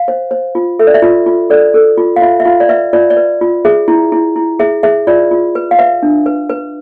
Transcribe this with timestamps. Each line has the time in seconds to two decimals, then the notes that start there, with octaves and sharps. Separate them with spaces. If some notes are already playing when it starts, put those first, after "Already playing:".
Already playing: F5
0.08 C5
0.31 C5
0.55 F4
0.79 A4 E5
0.87 D5
0.94 E5
1.02 F4
1.26 F4
1.50 A4 D5
1.74 A4
1.98 F4
2.16 F5
2.22 F4 E5
2.40 E5
2.45 F4 F5
2.60 D5
2.69 B4 E5
2.93 F4 D5
3.10 D5
3.17 B4
3.41 F4
3.65 G#4 E5
3.88 E4
4.12 E4
4.36 E4
4.59 G#4 E5
4.83 G#4 E5
5.07 F4 D5
5.31 F4
5.55 B4
5.71 F5
5.79 B4 E5
6.03 D4
6.26 B4
6.49 B4